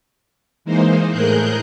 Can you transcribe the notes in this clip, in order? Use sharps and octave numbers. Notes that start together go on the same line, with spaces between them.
E3 G#3 A#3 D#4 C5
A2 G#4 A#4 F#6 G6